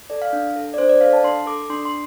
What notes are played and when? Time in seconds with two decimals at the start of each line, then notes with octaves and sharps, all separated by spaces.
0.10 A4 D5
0.22 F5
0.33 D4
0.56 A4
0.74 D5
0.78 D4 C5
0.89 D5
1.01 A4 F5
1.13 A5
1.24 D4 C6
1.46 A4 D6
1.70 D4 C6
1.85 C6